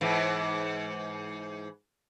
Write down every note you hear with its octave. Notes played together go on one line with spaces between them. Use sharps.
G#2 E3